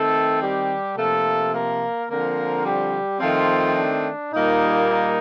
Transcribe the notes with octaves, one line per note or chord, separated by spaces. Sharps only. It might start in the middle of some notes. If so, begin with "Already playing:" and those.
Already playing: D#3 A3 C4 A4
G3 G4
C3 F3 A3 A#3 A4
A#3 A#4
D3 F3 A#3 C4 A#4
G3 G4
D#3 F3 A3 C4 F4
D4
A#2 G3 A#3 D#4
D#4